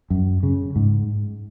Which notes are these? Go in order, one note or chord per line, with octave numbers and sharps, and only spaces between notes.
F#2
C#3
G#2